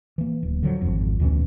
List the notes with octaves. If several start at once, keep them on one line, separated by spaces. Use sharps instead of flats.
E3 A#3
D1
D3 F3 F#3
G#1 F2
D2 B2 E3 C#4